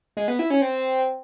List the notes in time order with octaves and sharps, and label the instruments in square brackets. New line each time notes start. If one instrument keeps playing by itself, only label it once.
[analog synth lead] G#3
B3
E4
C#4
C4